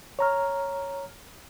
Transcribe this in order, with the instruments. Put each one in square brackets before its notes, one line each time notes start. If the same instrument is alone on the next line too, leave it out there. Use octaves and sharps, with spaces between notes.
[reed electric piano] C#5 A#5 F6